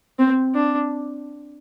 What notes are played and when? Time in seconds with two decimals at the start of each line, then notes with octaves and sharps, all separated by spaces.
0.19 C4
0.55 D4